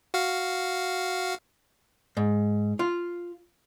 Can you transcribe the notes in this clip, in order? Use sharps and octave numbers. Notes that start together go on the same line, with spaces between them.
F#4 F5
G#2
F4